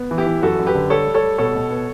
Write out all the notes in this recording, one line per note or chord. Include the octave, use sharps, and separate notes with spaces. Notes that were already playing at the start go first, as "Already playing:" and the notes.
Already playing: B3
E3
E4 G4
E3
F#2 F#4 A4
F#2
G4 B4
D3
G3 A4 C#5
G3
A4 C#5
G3
B2 A4 C#5
B2
B3